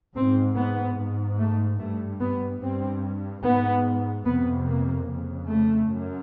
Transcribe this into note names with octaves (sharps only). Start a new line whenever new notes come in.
G#2 C4
B3
G#2
A3
G2 A3
B3
G2 C4
G#2 B3
F2 C3 B3
A#3
F2 C#3
A3
F#2